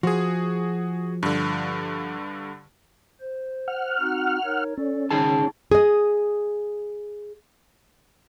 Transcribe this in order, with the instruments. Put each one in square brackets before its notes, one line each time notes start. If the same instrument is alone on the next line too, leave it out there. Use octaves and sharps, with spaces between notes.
[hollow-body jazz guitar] F3 [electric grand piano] F#4 G#4
[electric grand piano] G2 D3
[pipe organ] C5
[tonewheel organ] F#5 F6
[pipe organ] C4 D#4 F#4
D#4 A#4 C#5
[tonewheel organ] C#4 [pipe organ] A4 D5
[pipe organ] C#3 [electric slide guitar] D#4 G#4 A5
[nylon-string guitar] G#4 D#5